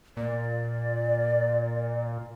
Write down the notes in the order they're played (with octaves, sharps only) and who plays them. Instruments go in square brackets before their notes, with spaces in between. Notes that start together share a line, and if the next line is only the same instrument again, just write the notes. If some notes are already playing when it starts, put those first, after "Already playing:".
[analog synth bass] A#2 [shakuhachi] D5